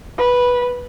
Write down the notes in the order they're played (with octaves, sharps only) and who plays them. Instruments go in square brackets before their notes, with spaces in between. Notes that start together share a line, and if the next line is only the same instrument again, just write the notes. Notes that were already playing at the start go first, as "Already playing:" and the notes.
[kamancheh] B4